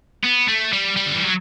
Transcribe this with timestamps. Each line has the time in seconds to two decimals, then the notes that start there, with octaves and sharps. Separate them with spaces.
0.24 B3
0.48 A3
0.73 G3
0.96 G3
1.06 D3
1.15 E3
1.24 F#3